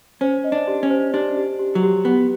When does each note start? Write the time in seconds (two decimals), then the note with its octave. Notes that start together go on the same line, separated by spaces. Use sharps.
0.21 C#4 C5
0.44 D#5
0.52 D4
0.67 G4
0.83 C#4
0.90 C5
1.14 D4 G4
1.37 G4
1.59 G4
1.75 F#3
1.83 G4
2.05 B3 G4